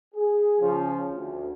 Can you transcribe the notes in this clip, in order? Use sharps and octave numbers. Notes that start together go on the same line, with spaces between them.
G#4
C#3 F3 C#4 F4
D2